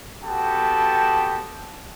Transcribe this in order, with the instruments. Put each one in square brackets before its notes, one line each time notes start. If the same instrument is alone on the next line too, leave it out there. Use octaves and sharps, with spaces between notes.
[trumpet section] B3 F#4 G4 A4 G5 A5